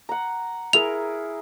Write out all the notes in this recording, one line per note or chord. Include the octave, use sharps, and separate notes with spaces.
F#5 A#5
E4 G#4 A#4 F7